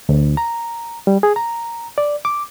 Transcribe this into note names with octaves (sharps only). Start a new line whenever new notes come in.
D2
A#5
G3
G#4
A#5
D5
D6